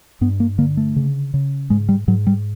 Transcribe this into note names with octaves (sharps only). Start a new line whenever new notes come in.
G2 B3
A#3
D3 A#3
A3
C#3
C#3
G#2 G#3
G3
G#2 F#3
G3